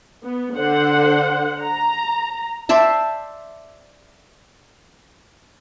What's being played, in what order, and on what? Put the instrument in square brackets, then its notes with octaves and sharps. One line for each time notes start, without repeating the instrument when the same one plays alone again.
[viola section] B3
D3 C5 F#5
A#5
[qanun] C5 D5 E5 A5